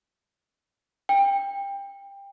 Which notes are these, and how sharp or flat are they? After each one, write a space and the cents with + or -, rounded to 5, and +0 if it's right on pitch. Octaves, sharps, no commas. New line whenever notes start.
G5 +25